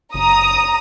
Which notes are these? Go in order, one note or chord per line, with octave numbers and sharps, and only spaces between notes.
F#1 A#5 D#6